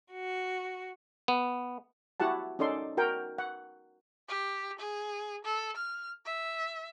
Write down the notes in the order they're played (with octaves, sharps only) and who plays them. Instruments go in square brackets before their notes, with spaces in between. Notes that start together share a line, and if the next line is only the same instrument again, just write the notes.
[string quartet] F#4
[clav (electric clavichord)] B3
[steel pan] E4 F#4 G4 F#5 A5
C#4 D#4 A4 D5 C6
F#4 A#4 G5
F#5
[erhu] G4
G#4
A4
F6
E5